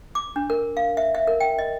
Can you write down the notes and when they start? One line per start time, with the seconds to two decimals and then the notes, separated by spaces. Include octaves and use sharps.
0.15 D6
0.36 D4
0.50 A#4
0.77 F5
0.97 E5
1.15 E5
1.27 A#4
1.40 G5
1.59 D#5